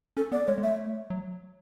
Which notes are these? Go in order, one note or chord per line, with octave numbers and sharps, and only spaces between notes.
C#4 A4
B3 D5
G#3 C#5
G#3
A3 E5
F#3